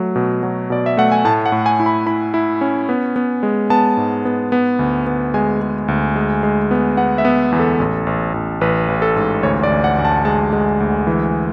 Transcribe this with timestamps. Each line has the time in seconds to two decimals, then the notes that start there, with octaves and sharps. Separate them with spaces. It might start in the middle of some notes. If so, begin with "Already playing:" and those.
Already playing: F#3 A3
0.16 B2
0.43 F#3
0.70 B2 D5
0.86 E5
0.97 A3 F#5
1.12 G#5
1.25 A2 A5
1.46 F#5
1.52 A2
1.66 G#5
1.80 E4
1.86 B5
2.06 E4 B5
2.34 E4
2.61 C#4
2.89 B3
3.16 B3
3.43 G#3
3.70 B3 A5
3.97 G#2
4.25 B3
4.52 B3
4.79 D2
5.07 B3
5.34 G#3 G#5
5.62 G#3
5.88 D2
6.16 G#3
6.43 G#3
6.71 B3
6.97 B3 F#5
7.18 E5
7.25 B3
7.52 E2
7.59 A4
7.80 A1
8.07 A1
8.34 A1
8.61 A1 B4
8.88 A1
9.02 A4
9.16 G#2
9.43 D2 C#5
9.63 D5
9.70 D2
9.84 F#5
9.98 D2
10.05 A5
10.25 G#3 A5
10.53 G#3
10.80 D2
11.07 E3